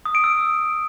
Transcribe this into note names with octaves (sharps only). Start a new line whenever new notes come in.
D#6
D7
E6